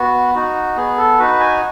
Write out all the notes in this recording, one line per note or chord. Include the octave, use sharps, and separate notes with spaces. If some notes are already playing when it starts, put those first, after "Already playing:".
Already playing: B3 F#4
D#4 F#4
B3 G#4
A4
D#4 F#4 B4
G#5